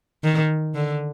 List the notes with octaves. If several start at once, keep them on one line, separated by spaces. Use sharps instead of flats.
D#3
D3